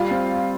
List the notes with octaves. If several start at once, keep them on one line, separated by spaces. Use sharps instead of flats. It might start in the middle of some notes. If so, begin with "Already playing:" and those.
Already playing: G3 F4
C4